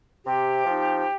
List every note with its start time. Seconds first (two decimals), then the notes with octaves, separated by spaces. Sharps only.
0.25 C3 G4
0.65 F3 C4 D#4